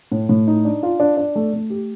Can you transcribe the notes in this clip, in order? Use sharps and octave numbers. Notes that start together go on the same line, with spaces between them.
A2
A2
D#4
D4
F4
D4
D4
A3
A3
G4